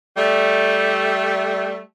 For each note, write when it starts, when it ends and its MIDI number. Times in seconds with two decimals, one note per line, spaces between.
0.17 1.80 55
0.17 1.80 57